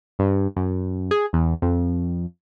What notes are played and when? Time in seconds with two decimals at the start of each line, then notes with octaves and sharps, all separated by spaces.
0.19 G2
0.56 F#2
1.11 G#4
1.33 E2
1.62 F2